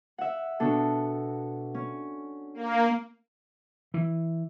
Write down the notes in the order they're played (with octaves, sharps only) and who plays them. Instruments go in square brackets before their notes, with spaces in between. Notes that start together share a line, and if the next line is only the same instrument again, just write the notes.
[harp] E5 F#5
B2 D4 A4
C#4
[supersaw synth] A#3
[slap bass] E3